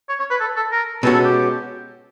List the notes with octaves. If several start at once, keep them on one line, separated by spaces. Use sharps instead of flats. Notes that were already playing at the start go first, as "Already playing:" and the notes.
C#5
C#5
B4
A4
A4
A#4
B2 G#3 C#4 F#4 A4
A4
G4